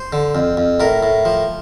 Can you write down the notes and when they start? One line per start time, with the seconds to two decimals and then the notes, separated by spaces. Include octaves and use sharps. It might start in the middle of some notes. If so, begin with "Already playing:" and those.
Already playing: C5
0.13 D3
0.35 F2
0.57 F2
0.80 A2 A#4
1.03 A2
1.25 F3